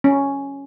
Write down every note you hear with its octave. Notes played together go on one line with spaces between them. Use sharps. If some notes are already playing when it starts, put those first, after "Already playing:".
C#4